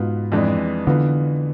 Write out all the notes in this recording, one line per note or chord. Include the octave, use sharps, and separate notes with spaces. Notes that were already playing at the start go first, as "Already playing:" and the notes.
Already playing: G#2 B2 B3 F4
F2 E3 G#3 D4
D3 E3 B3 F4